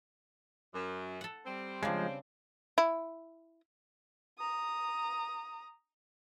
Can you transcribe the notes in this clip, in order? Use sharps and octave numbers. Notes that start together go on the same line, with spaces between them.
F#2
A4 F#5
G3 C4
C#3 F3 G#3 D4
E4
A#5 D#6